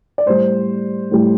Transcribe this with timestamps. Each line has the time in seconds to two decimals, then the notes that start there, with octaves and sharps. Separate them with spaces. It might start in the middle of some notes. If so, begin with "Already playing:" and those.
0.18 D5
0.26 A2 G3 C5
1.11 A2 G3